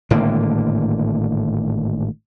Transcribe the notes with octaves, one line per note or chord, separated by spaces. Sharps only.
G#1 A2 D3 A#3